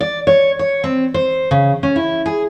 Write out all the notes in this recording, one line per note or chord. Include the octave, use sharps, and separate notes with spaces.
D5
C#5
C#5
C4
C5
C#3
C#4
E4
G#4